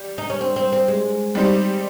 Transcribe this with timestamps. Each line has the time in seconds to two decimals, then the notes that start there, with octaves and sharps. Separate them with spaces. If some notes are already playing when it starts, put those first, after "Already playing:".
Already playing: G3 G4
0.18 D#4
0.30 C#4
0.41 C4
0.56 C4
0.72 C4
0.88 G#3
1.35 G3 C4 D#4 G4 C5